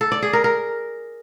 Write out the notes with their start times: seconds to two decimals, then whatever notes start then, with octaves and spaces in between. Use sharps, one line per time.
0.01 A4
0.12 D5
0.22 G#4
0.33 A#4
0.44 A#4